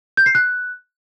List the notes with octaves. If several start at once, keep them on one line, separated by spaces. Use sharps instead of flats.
G6
C7
F#6